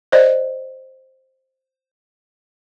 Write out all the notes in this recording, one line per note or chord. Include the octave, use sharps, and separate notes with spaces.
C5 D5 D#5